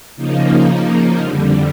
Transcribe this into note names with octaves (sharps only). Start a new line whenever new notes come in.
C#3 F3 A#3 D#4
F2 D3 G3